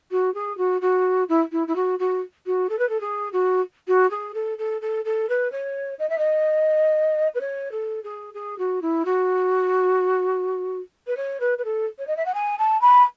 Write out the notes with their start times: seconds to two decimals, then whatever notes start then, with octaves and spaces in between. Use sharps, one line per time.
0.11 F#4
0.34 G#4
0.57 F#4
0.81 F#4
1.29 E4
1.52 E4
1.67 E4
1.75 F#4
1.99 F#4
2.46 F#4
2.69 A4
2.78 B4
2.89 A4
3.00 G#4
3.33 F#4
3.87 F#4
4.10 G#4
4.34 A4
4.58 A4
4.81 A4
5.05 A4
5.29 B4
5.52 C#5
5.99 D#5
6.09 E5
6.18 D#5
7.34 B4
7.40 C#5
7.71 A4
8.04 G#4
8.34 G#4
8.58 F#4
8.82 E4
9.05 F#4
11.07 B4
11.17 C#5
11.40 B4
11.58 B4
11.64 A4
11.98 C#5
12.07 D#5
12.16 E5
12.25 F#5
12.34 G#5
12.58 A5
12.81 B5